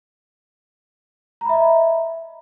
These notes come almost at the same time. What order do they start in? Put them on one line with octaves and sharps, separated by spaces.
A#5 B5 E5 D#5